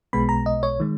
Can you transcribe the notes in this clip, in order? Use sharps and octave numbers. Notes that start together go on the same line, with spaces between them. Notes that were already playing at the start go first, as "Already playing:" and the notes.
B1 B2 G#3 B3 B5
A#5
D#5
C#5
D#3 G#3